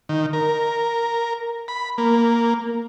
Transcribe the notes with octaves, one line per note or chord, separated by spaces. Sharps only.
D#3
A#4
B5
A#3